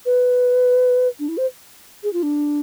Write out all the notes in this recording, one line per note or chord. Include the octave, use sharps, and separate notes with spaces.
B4
D4
E4
C5
G#4
F4
D4